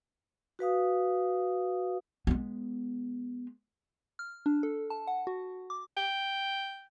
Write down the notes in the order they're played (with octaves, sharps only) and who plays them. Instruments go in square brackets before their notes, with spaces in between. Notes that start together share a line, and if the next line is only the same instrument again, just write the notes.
[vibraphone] F#4 B4 F5 D#6
[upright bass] G#3 B3
[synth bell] F6
D4
A4
A5
F#5
F#4
D6
[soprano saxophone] G5